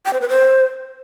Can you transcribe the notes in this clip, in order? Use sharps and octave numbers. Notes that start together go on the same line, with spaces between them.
G5
C5
B4
C5